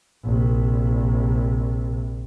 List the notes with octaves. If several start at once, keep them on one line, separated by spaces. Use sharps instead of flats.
A#1 C3